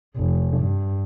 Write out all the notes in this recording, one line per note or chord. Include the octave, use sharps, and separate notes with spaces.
F1
G2